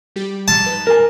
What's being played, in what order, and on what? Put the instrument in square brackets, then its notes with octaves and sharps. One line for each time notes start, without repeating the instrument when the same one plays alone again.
[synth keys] G3 G4
[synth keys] G#2 F3 [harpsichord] A5
[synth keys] D#4 B4
[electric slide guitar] A#4 G#5